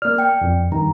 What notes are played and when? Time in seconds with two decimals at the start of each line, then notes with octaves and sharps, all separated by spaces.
0.02 A#3 D5 F6
0.18 G5 C#7
0.41 F2
0.72 G2 D#3 A#5